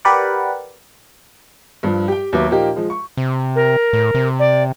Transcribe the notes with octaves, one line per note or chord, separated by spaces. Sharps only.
G4 A#4 B4 D5 F#5
G2 F3
G4 G5
D#2 F#3 B3 E5 D6
A#2 F3 A#3 D#4 G4
F3 G#3
C#6
C3
A#4
A2
C3
D5